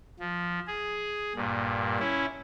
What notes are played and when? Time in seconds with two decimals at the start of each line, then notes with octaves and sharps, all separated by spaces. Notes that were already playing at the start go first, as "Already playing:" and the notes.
0.19 F3
0.67 G#4
1.36 G2 A#2
1.99 C#4 E4